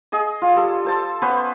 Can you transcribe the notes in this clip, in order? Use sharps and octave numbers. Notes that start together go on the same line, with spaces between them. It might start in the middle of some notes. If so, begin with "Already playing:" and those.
G#4 D#5
F4
G3 A4
A4 C5 A5
B3 C#4 B4 C5